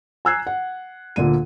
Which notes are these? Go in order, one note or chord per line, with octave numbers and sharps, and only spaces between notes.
G#5 A#5 E6 F#6 G#6 C7
F#5
D2 A#2 D3 A#3 D#7